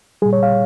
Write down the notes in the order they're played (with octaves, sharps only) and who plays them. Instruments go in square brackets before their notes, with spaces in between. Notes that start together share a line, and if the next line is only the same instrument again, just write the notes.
[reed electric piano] G3 G#4
A#2
C#5
F5